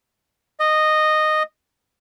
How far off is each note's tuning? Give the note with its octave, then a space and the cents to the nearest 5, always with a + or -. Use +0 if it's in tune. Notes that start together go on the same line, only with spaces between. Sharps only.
D#5 -10